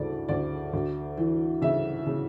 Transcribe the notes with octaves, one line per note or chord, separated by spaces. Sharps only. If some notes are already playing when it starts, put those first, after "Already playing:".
Already playing: D2 C#3 E3 A4 D5
D2 D5
D2
E3
C#3 E5
C#3